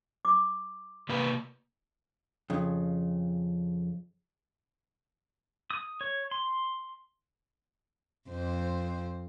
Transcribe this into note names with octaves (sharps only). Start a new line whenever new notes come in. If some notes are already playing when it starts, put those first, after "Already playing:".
D6
C3 A#3 B4
F2 C#3
D#6
C#5
C6
F2 C5